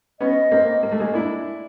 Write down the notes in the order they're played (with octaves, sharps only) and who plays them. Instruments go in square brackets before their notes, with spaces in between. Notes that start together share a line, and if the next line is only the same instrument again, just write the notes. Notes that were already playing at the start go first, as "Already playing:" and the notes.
[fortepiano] B3 C#4 [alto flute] D#5
[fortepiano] A#3 C4
A#3
A3
G#3 A#3
D4 E4